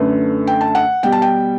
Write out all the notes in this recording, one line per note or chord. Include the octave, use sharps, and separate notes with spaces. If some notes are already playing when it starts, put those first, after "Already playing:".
Already playing: F#2 D3 A3 B4
G5
A5
F#5
B2 G3 G5
A5
G5